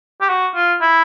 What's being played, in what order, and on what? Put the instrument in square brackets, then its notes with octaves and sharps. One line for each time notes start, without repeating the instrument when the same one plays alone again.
[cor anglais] G4
F#4
F4
E4